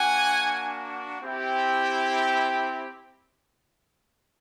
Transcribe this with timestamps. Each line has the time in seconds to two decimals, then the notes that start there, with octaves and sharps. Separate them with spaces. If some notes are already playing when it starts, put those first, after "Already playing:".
Already playing: A#3 D4 F#4 F#5 G#5
1.21 C4 E4 G4